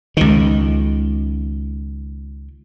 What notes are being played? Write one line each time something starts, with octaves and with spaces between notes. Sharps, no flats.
C#2 D#3